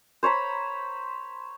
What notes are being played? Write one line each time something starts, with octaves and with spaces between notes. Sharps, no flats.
C5 C#5 A#5 B5